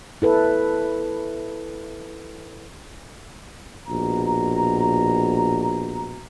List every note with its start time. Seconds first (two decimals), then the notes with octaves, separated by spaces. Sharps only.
0.22 E4 A4 B4
3.88 A#1 B2 A#5